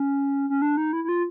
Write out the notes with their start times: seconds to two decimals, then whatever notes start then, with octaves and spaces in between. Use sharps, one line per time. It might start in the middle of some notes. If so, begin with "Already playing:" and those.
Already playing: C#4
0.50 C#4
0.62 D4
0.77 D#4
0.93 E4
1.04 E4
1.09 F4